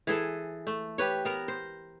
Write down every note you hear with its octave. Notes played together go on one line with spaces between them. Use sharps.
E3 G#4 A4
A3
G4 B4 C#5
B3 A#4
C5